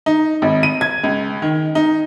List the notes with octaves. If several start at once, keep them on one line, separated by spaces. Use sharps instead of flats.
D#4
G#1
D#7
G#6
C#2
D#3
D#4